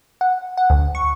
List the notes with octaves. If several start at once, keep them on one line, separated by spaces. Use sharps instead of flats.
F#5
F#5
D2
C#6